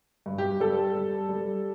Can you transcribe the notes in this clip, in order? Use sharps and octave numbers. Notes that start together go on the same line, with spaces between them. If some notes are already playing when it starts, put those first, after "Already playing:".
G2
G4
G3 A4
G3
G3